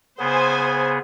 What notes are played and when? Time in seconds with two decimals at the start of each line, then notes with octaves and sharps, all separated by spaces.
0.19 C#3 B3 G#4 C5 G#5